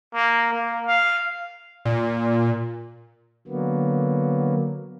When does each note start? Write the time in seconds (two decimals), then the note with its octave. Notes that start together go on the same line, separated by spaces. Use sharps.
0.14 A#3
0.53 A#3
0.86 F5
1.85 A#2
3.48 D3 F#3 A#3 B3